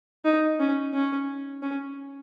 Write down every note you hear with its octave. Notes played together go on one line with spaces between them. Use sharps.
D#4
C#4
C#4
C#4